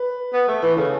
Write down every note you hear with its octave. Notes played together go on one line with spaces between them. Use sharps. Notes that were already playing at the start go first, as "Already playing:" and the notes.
Already playing: B4
B3
A3
E3 B4
C#3 A4